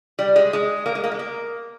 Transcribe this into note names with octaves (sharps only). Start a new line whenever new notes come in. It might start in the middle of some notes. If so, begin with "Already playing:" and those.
G3
G#3
G#3
A#3
G#3
A#3
G#3
A#3